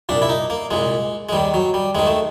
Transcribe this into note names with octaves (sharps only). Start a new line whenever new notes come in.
C2 A#2 D4
E4
D#4
A#3
C2 A#2 G#3
G#3
D#2 D#3 G3
F#3
G3
D#2 D#3 G#3
A3